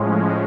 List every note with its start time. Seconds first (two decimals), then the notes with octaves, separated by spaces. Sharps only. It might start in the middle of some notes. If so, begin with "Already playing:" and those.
Already playing: A2 F3 G#3 C#4